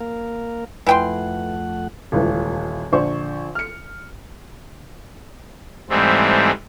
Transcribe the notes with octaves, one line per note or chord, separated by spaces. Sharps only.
A#3 A#4 F5
F2 E3 A3 F#5 G5 C6
D#1 C#2 E3
A#1 D3 F3 C5 D5 C#6
F6 C#7
G#2 E3 G3 A3 C4